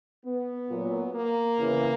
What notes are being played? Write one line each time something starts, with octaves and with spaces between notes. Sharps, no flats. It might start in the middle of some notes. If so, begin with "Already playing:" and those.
B3
A#2 F#3
A#3
E2 C#3 E3